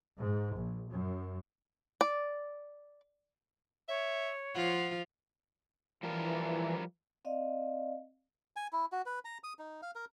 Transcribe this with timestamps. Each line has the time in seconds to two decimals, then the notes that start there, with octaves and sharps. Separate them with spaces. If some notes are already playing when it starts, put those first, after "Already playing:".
0.18 G#2
0.55 A#1
0.89 F#2
2.01 D5
3.89 C#5 E5
4.55 F3 F4 F#5
6.03 E3 F3 G3 A#4
7.25 C4 D5 D#5 F5
8.56 G#5
8.73 E4
8.92 F#4
9.06 B4
9.25 A#5
9.44 D#6
9.59 D#4
9.82 F5
9.95 A#4